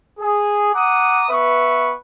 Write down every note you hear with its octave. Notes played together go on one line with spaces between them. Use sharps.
G#4
F#5 A#5 D6 D#6
B3 B4 E5 C#6